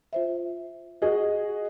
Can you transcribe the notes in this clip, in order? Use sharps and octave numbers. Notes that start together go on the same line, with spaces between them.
F4 C5 E5
F#4 G#4 D#5